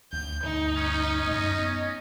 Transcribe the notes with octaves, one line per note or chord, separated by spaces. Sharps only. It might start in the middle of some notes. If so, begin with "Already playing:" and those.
D2 G6
D2 G2 D3 D#4
C#4
F#2 A3 D#5
B3